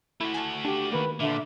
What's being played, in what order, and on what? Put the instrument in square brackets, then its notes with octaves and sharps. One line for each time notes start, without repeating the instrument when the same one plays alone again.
[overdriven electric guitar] A3 F#4 [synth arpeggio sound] E4
[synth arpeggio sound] G#5 A5
[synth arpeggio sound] D4 [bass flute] G4
[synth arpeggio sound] D#3 A#3 [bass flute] B4
[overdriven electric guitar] A#2 [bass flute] D3 [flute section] D4 E5 D6